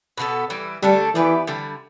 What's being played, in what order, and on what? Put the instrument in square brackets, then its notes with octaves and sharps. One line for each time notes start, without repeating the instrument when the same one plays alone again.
[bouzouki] B2 B3 D4 A4
E3 G3 E4
[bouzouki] D3 A3 D4 A4 [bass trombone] G3
[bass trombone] E3 [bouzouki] B3 G4 B4 D5
[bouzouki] D3 G3 E4